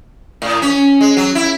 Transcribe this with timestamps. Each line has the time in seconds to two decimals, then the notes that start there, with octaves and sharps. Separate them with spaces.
0.42 A2
0.62 C#4
1.01 G#3
1.17 F#3
1.35 E4